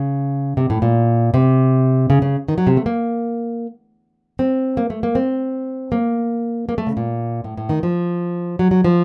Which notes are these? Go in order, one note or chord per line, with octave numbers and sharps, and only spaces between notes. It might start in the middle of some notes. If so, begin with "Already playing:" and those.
Already playing: C#3
C3
A2
A#2
C3
C#3
C#3
D#3
F#3
C3
A3
A#3
C4
A#3
A3
A#3
C4
A#3
A#3
A3
C#3
A#2
A2
A2
D#3
F3
F#3
F#3
F3